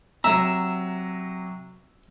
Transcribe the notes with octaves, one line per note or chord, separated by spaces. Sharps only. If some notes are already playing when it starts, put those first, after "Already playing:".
C3 F#3 E5 A#5